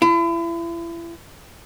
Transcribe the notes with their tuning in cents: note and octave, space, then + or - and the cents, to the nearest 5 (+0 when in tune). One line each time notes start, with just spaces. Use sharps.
E4 +35